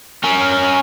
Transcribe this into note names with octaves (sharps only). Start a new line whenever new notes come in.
C#4 A#4